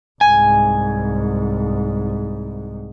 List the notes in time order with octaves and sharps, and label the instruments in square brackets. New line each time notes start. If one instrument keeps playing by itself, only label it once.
[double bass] C2 G#2 [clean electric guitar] G#5